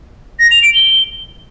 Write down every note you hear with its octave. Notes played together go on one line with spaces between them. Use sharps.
A#6
F7
D7
G7